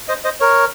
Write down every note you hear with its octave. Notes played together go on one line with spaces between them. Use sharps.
C5 D#5
C5 D#5
A#4 C#5